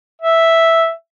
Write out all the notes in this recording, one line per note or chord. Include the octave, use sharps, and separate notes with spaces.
E5